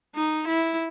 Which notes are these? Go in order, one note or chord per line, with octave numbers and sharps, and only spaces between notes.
D#4
E4